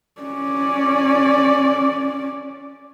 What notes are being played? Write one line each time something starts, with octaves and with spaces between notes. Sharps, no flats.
C#4 D5